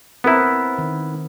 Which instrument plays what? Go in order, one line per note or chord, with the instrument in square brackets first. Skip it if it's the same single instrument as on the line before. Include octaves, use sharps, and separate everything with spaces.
[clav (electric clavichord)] B3 E4 [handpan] C4 A#4 E5
[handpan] D#3